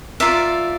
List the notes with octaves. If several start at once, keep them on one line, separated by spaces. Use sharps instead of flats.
F4 A#4 D5 E5